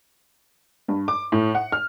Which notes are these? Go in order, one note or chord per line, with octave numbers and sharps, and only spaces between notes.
G2
D6
A2
F#5
F6